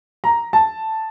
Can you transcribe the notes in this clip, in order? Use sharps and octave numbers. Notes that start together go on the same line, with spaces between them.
A#5
A5